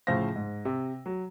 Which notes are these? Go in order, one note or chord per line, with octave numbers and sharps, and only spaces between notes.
A2 C#3 F3 C5 F5 A#6
G#2
C3
F#3